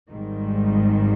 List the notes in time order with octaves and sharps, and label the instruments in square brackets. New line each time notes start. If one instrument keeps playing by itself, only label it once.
[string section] G#1 G#2 D#3 G3